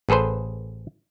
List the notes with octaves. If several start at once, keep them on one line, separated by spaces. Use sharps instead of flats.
A1 G#4 A4 B4 C5